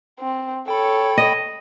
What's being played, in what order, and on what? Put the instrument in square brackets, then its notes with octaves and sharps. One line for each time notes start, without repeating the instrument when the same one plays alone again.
[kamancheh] C4
[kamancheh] A4 C#5 [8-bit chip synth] G5 B5
[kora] D#5